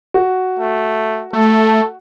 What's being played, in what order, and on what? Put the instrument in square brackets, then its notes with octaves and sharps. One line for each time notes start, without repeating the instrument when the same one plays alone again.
[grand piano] F#4
[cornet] A3
[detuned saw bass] A3 [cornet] A4